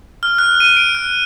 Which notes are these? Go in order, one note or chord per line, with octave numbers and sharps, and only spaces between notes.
F6
F#6
D#7
D7
F#6